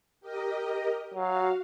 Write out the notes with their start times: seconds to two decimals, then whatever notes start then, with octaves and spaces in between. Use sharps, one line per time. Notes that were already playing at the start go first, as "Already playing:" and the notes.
0.21 G4 A#4 D#5
1.14 F#3 F#4 F5